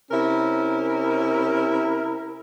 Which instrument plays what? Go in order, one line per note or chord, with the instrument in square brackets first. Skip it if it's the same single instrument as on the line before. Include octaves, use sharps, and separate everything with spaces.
[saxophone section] C3 C#4 E4 A#4